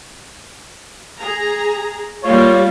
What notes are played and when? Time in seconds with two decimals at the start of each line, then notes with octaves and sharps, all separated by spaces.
1.19 G#4 A#5
2.23 G3 A#3 F4 C#5